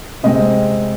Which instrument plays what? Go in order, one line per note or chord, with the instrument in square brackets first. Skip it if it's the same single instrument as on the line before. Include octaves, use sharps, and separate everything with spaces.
[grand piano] C3 G#3 C4 D#5